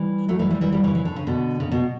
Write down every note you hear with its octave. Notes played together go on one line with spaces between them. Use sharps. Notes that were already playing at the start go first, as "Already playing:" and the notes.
Already playing: E3 G3
F#3 A3
E3 G3
E3 G3
E3 G3
E3 G3
C#3 E3
E3
D3
C#3
B2 D3
C#3
B2